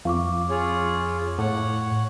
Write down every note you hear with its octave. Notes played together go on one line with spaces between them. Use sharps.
F2 F5 C#6 D6
F4 G#4 C#5
A2 C#5 F#5